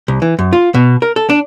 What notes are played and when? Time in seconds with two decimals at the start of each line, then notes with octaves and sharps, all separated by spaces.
0.08 C2
0.22 E3
0.39 F#2
0.53 F4
0.75 B2
1.02 A#4
1.16 A4
1.30 D4